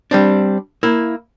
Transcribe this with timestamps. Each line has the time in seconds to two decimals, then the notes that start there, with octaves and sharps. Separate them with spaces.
0.11 G3 C4 D4
0.83 A#3 E4